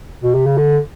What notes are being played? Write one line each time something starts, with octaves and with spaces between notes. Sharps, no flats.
B2
C3
C#3
D3